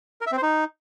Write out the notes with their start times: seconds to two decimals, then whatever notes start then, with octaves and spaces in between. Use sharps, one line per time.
0.21 A#4
0.27 E5
0.32 C4
0.37 C5
0.43 D#4